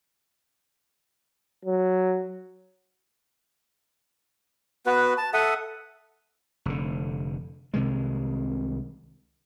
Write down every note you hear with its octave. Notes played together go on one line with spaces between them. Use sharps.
F#3
B3 F#4 B4
A5
A4 E5 F#5 D#6
F1 D3
C2 C3 D#3 G#3